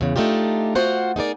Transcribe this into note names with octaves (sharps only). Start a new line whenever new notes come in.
E2 C#3
A3 D4 D#4 F4 G4
F4 F#4 C5 F#5
D#4 G#4 A#4 D5